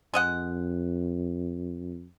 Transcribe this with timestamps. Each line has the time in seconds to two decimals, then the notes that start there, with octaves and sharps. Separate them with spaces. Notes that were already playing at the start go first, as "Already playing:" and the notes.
0.14 F2 G#3 D#5 F#5